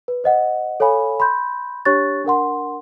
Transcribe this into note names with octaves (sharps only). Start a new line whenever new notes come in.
B4
C5 D#5 F#5
A4 C#5 F5 G#5 B5
B5 C6 G6
D4 G4 C#5 C#6 F#6 A6
D4 A#4 F#5 C6